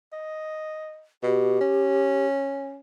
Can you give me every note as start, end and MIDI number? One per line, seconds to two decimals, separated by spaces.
0.13 1.04 75
1.23 1.58 47
1.23 2.27 67
1.61 2.80 61